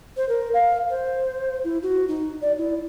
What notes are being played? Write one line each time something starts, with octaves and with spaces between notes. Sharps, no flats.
C5
A#4
F5
C5
E4
F#4
D#4
D5
E4